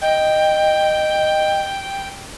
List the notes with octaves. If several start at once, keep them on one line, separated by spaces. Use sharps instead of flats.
D#5 G5